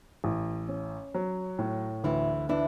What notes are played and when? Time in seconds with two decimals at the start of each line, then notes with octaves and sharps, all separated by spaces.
0.24 A1
0.68 C#4
1.14 F#3
1.59 A2
2.04 D2 E3 E4
2.49 E3 D4 E4